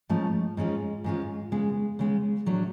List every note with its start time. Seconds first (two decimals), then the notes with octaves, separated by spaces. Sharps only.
0.09 G#2 F3 A3 C#4 F4
0.57 G#2 G#3 C#4 F4
1.04 G#2 G#3 C#4 F4
1.52 C#3 G#3 B3
1.99 C#3 G#3 B3
2.46 A2 F#3 A3 D4